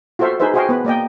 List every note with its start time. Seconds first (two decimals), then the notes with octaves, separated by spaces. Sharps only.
0.19 F4 F#4 A4 C5 E5 F5
0.40 D#4 G#4 B4 C5 E5
0.54 F#4 G#4 C5 D#5 F5 G5
0.69 B3 B4
0.85 A#3 D5 D#5 G5